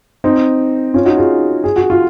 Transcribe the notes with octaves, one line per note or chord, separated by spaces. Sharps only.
C4 D#4
C#4 F4
D#4 F#4
F4 G#4
G#4
F#4
F4